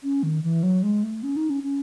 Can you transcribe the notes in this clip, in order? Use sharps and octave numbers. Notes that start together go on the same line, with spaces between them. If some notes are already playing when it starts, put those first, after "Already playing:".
C#4
D#3
E3
F#3
G#3
A3
C#4
D#4
C#4
C#4